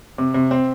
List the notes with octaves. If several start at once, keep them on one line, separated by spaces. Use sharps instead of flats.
C3
C3
C4